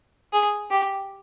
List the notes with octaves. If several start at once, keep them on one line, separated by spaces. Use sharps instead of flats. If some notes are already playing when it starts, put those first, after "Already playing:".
G#4
G4